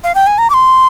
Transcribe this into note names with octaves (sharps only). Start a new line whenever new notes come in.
F5
G5
G#5
A#5
D6
C6